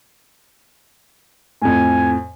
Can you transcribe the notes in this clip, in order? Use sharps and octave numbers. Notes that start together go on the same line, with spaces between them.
F2 A2 G#5